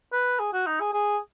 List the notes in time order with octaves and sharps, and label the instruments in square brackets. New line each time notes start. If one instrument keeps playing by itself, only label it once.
[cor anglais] B4
G#4
F#4
D#4
G#4
G#4